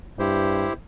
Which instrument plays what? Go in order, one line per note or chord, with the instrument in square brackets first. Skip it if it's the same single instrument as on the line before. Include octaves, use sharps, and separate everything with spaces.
[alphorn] G2 [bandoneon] E4 G4 C5